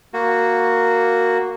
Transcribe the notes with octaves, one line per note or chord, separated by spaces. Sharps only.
A#3 F#4